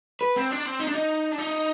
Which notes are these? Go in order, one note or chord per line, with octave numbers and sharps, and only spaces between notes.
B4
C4
D4
C4
D#4
D4
D#4
D4
D#4